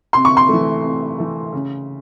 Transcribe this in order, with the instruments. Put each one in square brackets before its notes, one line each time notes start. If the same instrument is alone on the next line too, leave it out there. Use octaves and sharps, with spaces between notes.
[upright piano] C3 C6
C#6
C6
E3 A3
C3
E3 A3
C#3